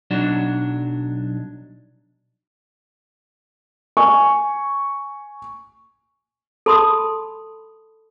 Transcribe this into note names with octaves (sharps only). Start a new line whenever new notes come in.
B1 F#3 D4
G#5 C#6
A4 A5 B5 C6 D#6